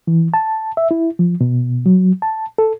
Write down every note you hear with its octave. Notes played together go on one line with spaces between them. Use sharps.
E3
A5
E5
E4
F3
B2
F#3
A5
A4